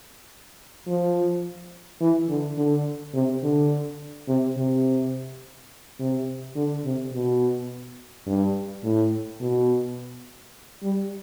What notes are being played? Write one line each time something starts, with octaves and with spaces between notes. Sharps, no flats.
F3
E3
D3
D3
C3
D3
C3
C3
C3
D3
C3
B2
G2
A2
B2
G3